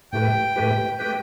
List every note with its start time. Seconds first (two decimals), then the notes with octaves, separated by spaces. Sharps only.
0.12 A2 A3 G4 B4 G5
0.56 A2 A3 G4 B4
0.99 A3 G4 B4 G5